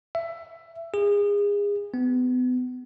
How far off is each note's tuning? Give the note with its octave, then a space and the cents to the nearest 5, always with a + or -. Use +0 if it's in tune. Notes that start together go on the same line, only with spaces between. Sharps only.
E5 +15
G#4 -30
B3 +30